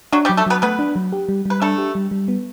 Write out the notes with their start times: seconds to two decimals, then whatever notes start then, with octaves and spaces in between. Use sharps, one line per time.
0.12 F#3 D4 F#4
0.25 G3 G4
0.29 F#3
0.37 A3 A4
0.47 F#3 B3 B4
0.62 A3 B3 B4
0.79 D4
0.96 F#3
1.12 G4
1.29 G3
1.46 G3 B4
1.61 A3 D4 A4
1.78 G4
1.95 G3
2.11 G3
2.28 B3